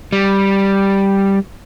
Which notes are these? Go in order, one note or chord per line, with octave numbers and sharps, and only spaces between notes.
G3